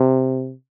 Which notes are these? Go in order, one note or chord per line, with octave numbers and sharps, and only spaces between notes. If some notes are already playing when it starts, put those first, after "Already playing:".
Already playing: C3